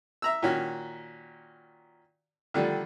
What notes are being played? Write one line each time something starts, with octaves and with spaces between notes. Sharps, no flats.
E5 A#5 E6
A#2 D#3 C#4 F#4
D3 D#3 F3 G3 A3 D4